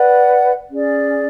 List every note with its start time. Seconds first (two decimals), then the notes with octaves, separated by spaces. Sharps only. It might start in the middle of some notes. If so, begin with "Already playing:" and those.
Already playing: B4 D5 F#5
0.70 C#4 G#4 D5